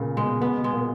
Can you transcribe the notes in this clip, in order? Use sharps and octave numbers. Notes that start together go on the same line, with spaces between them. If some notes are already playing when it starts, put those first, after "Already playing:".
Already playing: A#2 C#3 B3
B2 G#3
B2 B3
B2
G#3
A#2